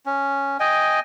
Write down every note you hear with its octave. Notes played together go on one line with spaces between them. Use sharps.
C#4
D#5 G5 G#5